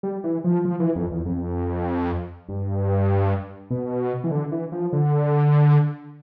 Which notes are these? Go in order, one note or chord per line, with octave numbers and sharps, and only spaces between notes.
G3
E3
F3
F3
E3
F2
E2
F2
G2
B2
E3
D3
E3
F3
D3